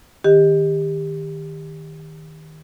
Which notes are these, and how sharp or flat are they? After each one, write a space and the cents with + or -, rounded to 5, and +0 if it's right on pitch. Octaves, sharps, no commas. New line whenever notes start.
D#3 +0 G4 +20 D#5 +0